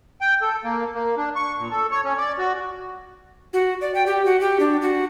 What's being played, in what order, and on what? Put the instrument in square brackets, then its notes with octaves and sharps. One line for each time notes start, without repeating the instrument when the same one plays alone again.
[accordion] G5
A4
A#3
A#3
D4
C#6
A#2
A4
C#5
C#4
D5
F#4
[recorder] F#4
D5
G5
G4
F#4
G4
D4
F#4